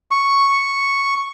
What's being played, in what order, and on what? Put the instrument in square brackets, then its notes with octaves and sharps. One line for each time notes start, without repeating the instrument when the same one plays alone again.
[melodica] C#6